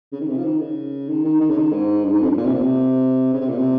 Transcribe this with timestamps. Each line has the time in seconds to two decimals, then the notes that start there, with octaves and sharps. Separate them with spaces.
0.13 C#3
0.20 D#3
0.29 C3
0.37 F3
0.45 D#3
0.61 C#3
1.09 D#3
1.25 D#3
1.41 D#3
1.50 C#3
1.58 D#3
1.73 G#2
2.05 G2
2.14 G#2
2.22 F2
2.29 G2
2.38 A#2
2.45 C3
2.54 A#2
2.61 C3
3.34 C#3
3.41 C3
3.49 A#2
3.57 C3